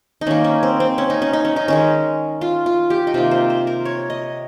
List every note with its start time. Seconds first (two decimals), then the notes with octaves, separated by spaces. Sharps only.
0.21 D#4
0.27 D#3 A#3 C#4
0.44 C#4
0.63 C4
0.80 C4
0.98 C#4
1.10 D#4
1.22 C#4
1.33 D#4
1.45 C#4
1.56 D#4
1.68 D#3 G#3 C#4
2.41 F4
2.66 F4
2.90 G4
3.07 D#4
3.14 C3 D#3 A#3 F4
3.31 C5
3.50 C5
3.67 A#4
3.85 C#5
4.10 D#5